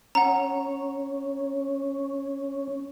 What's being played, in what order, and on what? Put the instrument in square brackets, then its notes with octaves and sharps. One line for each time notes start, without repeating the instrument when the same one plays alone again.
[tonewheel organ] C#4 [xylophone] F#5 A#5